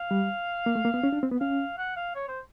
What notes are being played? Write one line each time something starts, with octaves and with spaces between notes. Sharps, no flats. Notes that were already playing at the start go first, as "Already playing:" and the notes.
Already playing: F5
G3
A#3
A3
A#3
B3
C#4
D4
C4
B3
C#4 F5
F#5
F5
C#5
C5